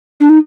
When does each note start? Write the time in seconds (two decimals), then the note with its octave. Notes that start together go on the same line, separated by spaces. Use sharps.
0.20 D4
0.29 D#4